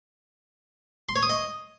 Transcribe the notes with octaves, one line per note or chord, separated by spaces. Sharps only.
C6
C#5
D#6
D#5